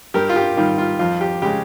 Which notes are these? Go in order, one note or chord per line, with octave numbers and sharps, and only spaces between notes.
G2 G4 A#4
F4
G4
D#3 G3 F4
F4
F2 F4
G4
C#3 G#3 G4